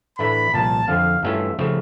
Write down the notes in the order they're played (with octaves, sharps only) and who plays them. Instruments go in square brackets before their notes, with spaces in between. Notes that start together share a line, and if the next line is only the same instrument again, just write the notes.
[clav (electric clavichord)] A2 E3 A3 D4 [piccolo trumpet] B5
[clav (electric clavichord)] C2 A#2 F3 [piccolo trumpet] A5
[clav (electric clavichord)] F2 D3 F3 [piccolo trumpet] F5
[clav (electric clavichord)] G2 E3 A3 C#4 F4 [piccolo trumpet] E5
[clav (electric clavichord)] C#3 F3 A3